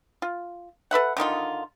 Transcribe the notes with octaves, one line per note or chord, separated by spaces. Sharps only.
F4
A4 B4 E5 F#5
D3 D#3 D#4 F4